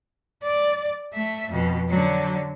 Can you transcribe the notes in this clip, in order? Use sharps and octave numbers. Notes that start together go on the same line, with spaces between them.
D5
A3 E5
F2 B2
D3 F#3